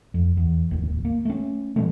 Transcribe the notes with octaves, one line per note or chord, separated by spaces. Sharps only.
F2
E2
D1 G#1 D#2
A#3
A3 C#4
A#2 E3 G3 A3